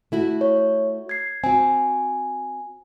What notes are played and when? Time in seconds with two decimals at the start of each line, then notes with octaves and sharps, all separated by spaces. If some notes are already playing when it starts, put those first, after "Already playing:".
0.12 A3 E4 F#4
0.41 C#5
1.09 G#6 C7
1.44 C4 F#4 G#5